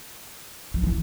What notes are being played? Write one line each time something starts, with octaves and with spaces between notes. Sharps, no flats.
F3
E3